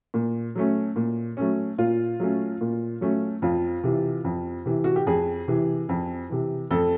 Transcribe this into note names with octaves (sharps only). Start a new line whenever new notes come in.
A#2
F#3 A3 C#4
A#2
F#3 A3 C#4
A#2 F4
F#3 A3 C#4
A#2
F#3 A3 C#4
F2 F4
C3 E3
F2
C3 E3
F#4
G4
F2 G#4
C3 E3
F2
C3 E3
F2 A4